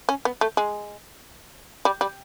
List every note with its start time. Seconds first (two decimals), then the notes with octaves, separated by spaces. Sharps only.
0.09 C#4
0.25 B3
0.41 A3
0.57 G#3
1.85 G3
2.01 G3